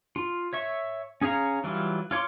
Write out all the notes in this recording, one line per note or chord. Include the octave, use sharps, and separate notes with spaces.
F4
C#5 E5 C#6
C#4 G#4 C#5 F5 A#5
E3 F#3 G3 F4
F4 C#5 C6 D6